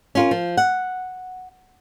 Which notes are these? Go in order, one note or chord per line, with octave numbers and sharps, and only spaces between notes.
C#4 F4 A#4
F3
F#5